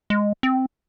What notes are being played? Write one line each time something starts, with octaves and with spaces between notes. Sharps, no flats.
G#3
C4